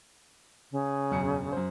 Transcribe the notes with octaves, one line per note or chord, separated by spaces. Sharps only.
C#3
E1 F#2 C#7
F#2 C5